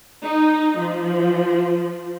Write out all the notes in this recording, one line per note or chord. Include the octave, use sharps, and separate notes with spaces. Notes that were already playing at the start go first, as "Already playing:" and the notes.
D#4
F3